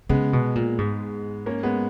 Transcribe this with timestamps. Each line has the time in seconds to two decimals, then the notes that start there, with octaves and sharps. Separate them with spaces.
0.09 C#3 G#3 B3
0.33 B2
0.55 A#2
0.78 G#2
1.46 A#3 C#4
1.63 G#3 B3